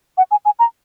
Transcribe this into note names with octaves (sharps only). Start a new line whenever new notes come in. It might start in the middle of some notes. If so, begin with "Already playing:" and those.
F#5
G#5
G#5
A#5